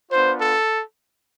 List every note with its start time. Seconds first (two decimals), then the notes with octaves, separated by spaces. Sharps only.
0.11 B3 D4 F4 C5
0.40 A4